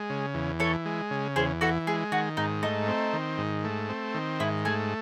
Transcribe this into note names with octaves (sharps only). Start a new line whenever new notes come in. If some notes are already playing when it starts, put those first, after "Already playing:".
Already playing: G#3
C#3
E2
E3 A4 C#5
G#3
C#3
E2 G#4 C5
E3 F#4 A4
G#3 G#4
D#3 F#4
G#2 D#4
A3 D#4
C4
D#3
G#2
A3
C4
D#3
G#2 E4
A3 G#4